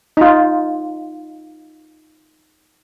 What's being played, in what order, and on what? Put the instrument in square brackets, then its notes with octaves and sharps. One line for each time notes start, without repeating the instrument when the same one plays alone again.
[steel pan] D#4 F4